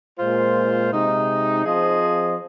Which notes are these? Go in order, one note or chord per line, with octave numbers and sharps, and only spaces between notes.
A#2 G#3 F4 C5
C3 G#3 D#4
F3 C4 G#4 C5 D#5